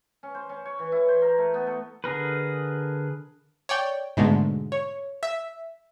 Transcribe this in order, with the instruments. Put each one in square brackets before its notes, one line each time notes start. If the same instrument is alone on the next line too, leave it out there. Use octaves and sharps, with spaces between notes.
[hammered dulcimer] C#4
C5
C#4
C#5
E3
E4
C5
A#4
A3
B3
A3
[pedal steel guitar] D3 G#4 A#4 B4
[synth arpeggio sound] C#5 D5 G5
G#2 B2 D3 G#3 A3
C#5
E5